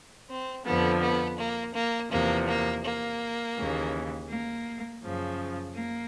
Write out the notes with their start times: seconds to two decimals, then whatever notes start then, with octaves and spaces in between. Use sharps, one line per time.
0.29 C4
0.65 F2 D3 F3 B3
1.01 B3
1.38 A#3
1.74 A#3
2.10 E2 C3 F3 A#3
2.48 A#3
2.84 A#3
3.56 D#2 C#3 E3
4.29 A#3
5.03 F#2 C#3 F3
5.76 A#3